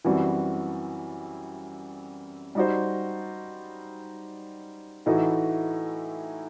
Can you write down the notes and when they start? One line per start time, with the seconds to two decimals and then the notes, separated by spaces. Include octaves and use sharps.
0.05 F#2 E3 G3 C4 F#4
2.55 G3 D#4 F#4 C5
5.06 A2 E3 A3 D#4 F#4